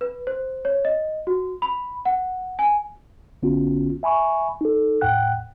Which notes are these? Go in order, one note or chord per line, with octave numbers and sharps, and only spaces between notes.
B4
C5
C#5
D#5
F#4
B5
F#5
G#5
A#1 D3 B3 C#4 F4 F#4
E5 G#5 B5 C#6
D#4 A4
E2 A2 F#5 G5 F#6